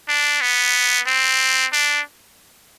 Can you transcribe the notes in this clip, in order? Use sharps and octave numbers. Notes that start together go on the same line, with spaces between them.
D4
B3
C4
D4